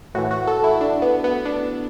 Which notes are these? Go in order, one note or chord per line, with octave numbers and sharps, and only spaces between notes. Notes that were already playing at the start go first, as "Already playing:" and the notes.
A2 E3 F#4
F#4
A4
E4
D4
B3
B3
D4